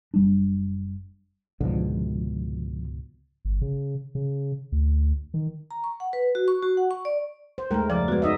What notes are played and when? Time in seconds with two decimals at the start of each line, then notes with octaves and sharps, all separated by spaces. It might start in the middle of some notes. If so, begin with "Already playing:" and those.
0.14 F#1 G3 D4
1.61 C#2 G#2 B2 D3 F3
3.45 G1
3.61 C#3
4.15 C#3
4.72 D2
5.34 D#3
5.71 A#5
5.84 C#6
6.00 F#5
6.13 B4
6.35 F#4
6.48 C#6
6.63 F#4
6.77 F#5
6.91 C#6
7.05 D5
7.58 C5
7.71 D#2 G#3 A3 A#4 G5
7.90 F#2 C#3 F3 D5
8.08 G#3 B3 F#4 G#4
8.22 D#4 D#5 E5